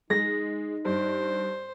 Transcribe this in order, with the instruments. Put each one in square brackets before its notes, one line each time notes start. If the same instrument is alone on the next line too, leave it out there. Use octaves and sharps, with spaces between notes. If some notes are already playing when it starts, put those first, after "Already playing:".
[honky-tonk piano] G#3 [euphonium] D#4 [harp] A#6
[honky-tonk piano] G2 [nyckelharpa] C5